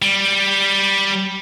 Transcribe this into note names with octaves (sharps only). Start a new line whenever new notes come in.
G3